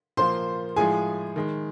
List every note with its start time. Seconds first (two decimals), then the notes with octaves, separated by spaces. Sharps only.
0.17 A#2 F3 A#3 C5 C6
0.76 A2 F3 G#3 G#4 G#5
1.36 D#3 G#3